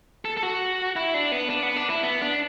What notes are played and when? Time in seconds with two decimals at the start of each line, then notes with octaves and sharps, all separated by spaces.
0.25 A4
0.37 A4
0.43 F#4
0.96 E4
1.14 D4
1.32 B3
1.50 D4
1.63 B3
1.76 D4
1.89 E4
2.03 B3
2.21 D4